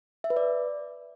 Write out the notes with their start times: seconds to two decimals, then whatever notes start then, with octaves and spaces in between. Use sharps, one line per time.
0.24 E5
0.30 B4
0.37 D5